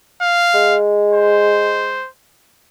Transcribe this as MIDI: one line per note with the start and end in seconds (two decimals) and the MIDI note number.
0.22 0.77 77
0.54 2.00 56
1.13 2.09 72